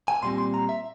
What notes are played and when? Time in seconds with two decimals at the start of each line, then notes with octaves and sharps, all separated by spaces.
0.08 G#5
0.23 A#2 G3 C4 C6
0.38 C6
0.54 A#5
0.69 E5